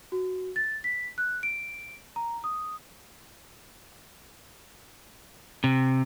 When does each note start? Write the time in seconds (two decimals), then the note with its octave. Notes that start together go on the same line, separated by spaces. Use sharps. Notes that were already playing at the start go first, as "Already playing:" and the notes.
0.12 F#4
0.56 A6
0.84 B6
1.18 F#6
1.43 D7
2.16 A#5
2.44 D#6
5.64 C3